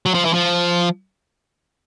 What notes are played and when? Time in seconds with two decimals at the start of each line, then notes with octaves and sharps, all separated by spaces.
0.06 F#3
0.14 F3
0.25 E3
0.34 F3